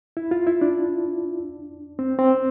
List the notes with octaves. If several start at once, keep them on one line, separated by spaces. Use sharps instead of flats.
E4
F4
E4
D4
C4
C4